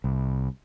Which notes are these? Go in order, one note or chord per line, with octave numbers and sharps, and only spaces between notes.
C2